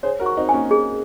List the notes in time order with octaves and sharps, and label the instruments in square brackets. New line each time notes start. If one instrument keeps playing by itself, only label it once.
[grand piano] G#4 C5 [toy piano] C#5
[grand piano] F#4 A#4
[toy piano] C#6
[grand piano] C4 D#4
[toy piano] G#5
[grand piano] A#3 C#4
[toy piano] G#4